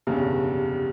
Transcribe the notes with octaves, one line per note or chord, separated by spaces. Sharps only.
F1 B1 E2 G2 C#3